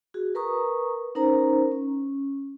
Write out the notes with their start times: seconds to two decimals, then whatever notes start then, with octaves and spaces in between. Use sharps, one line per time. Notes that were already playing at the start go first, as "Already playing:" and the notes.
0.14 F#4 G#4
0.35 A#4 B4 A#5 C#6 D#6
1.15 C#4 D#4 A#4 C5 A#5
1.72 C#4